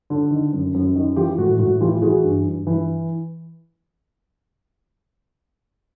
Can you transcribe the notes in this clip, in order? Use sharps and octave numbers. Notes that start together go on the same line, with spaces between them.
D3
D#3
F#2
F#2
D#3
E3 F4 G4
A2 F#4
A2 F#4
E3 F4 G4
E3 F#4 G#4
G2
G2
E3